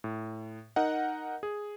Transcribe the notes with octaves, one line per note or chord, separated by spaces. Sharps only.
A2
D#4 A#4 D#5 F#5
G#4